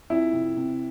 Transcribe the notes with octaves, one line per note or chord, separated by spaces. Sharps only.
F2 E4
C3
C3